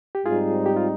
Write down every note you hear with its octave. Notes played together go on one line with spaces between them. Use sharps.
G4
G#2 G3 C4 D#4 F4 G#4
G4
F4